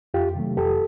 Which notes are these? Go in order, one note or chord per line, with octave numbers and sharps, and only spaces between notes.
F2 F4 G4
C3 D#3 F#3 A3
F2 G4 A4